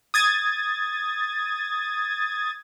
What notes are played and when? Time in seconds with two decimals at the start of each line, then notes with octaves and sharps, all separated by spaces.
0.14 D#6 G#6 A6